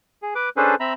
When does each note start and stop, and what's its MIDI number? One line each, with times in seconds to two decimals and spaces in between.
0.22 0.34 68
0.35 0.49 71
0.35 0.49 86
0.57 0.75 61
0.57 0.75 62
0.57 0.75 68
0.57 0.75 69
0.57 0.75 71
0.57 0.75 72
0.80 0.94 60
0.80 0.94 76
0.80 0.94 82
0.80 0.94 83